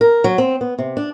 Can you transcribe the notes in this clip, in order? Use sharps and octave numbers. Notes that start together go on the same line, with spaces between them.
A#4
F#3
C4
B3
C3
D4